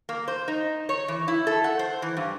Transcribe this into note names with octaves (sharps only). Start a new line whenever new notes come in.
A#3
C5
D#4
C#5
E3
E4
A4
F#5
C5
E3
G2